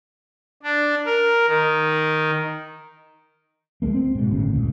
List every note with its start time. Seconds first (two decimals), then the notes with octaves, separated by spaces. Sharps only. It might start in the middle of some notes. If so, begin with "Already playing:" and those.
0.63 D4
1.05 A#4
1.48 D#3
3.82 C#2 G#3 A#3
3.95 C4
4.15 G#2 B2
4.31 G1 A2 C#3
4.53 D#1 C#2 A#2